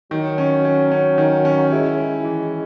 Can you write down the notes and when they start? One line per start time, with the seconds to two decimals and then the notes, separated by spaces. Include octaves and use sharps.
0.11 D#3 F#3
0.38 C#4
0.65 C#4
0.91 C#4
1.18 D#3
1.45 C#4
1.72 G#3 E4
1.98 E4
2.24 E3